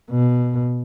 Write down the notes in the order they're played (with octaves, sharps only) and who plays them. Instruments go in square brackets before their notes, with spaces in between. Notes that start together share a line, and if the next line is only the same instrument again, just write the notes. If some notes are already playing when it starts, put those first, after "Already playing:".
[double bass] B2